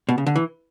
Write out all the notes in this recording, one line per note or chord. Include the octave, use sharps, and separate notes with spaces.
B2
C#3
D3
E3